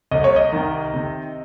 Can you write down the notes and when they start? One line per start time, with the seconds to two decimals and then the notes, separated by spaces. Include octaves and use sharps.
0.11 C2 D#5
0.24 C#5
0.36 D#5
0.52 D#3
0.93 C3